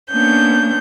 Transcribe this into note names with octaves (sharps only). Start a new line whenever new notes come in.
A#3 B3 C#4 D4 G6